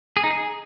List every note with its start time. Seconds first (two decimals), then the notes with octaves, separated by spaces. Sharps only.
0.17 G#4
0.24 D#4
0.31 G#4